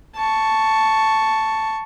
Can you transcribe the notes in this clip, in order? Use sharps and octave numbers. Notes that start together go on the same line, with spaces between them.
A5 C#6